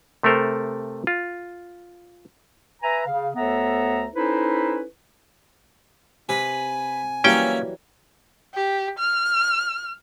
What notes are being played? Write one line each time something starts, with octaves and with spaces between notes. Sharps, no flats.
C3 A3 A4 A#4 C5
F4
B4 E5 G#5 A#5
C#3 F5
D2 B3 A4 C#5 E5 A#5
C#4 D#4 E4 A4 B4 C5
C3 B4 G#5 B5
E3 F#3 G3 A#3 C#4 E4 A#4 G5
G4
F6